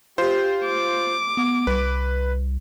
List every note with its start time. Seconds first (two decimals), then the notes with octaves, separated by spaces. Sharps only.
0.18 F4 G4 C5
0.66 D6
1.37 B3
1.67 C2 B4